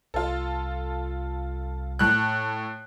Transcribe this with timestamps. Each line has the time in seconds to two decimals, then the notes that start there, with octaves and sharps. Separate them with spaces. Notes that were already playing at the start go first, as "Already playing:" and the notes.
0.14 C2 F4 A4
1.99 A2 F#6